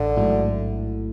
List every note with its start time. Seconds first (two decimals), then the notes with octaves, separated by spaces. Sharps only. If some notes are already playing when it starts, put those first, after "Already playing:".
Already playing: A1 D3
0.16 G#2 F#3 A3 E4